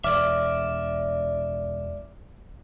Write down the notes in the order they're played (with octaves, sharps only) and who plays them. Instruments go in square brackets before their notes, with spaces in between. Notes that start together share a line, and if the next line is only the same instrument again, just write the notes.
[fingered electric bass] E1 [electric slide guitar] D5 E5 [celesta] D6 F6